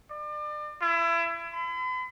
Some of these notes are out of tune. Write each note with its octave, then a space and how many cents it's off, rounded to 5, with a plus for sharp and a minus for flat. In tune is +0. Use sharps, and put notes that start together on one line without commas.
D5 +35
E4 +30
B5 +45